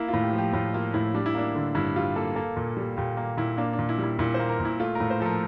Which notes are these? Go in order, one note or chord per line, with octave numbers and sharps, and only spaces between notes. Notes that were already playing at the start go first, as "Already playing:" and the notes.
Already playing: A#3 E4
F4
A2
G4
F3
G4
A2 F4
A#3 F4
A2 E4
G3 D4
E4
A#3 D4
D3
G2 E4
G3 F4
A#3 A4
A#3 A4
A#2
G3
A#2 G4
A#3
A#2 E4
A#3 D4
D4
A#2
E4
G3
E4
A#2 E4
C5
A#3
A#4
A#2
E4
A3 F4
A2 A#4
C5
F3 A4
A#4